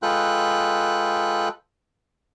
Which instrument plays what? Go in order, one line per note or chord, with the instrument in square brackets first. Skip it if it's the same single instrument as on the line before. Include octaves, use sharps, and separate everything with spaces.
[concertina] G#3 F4 A4 B4 G5 F#6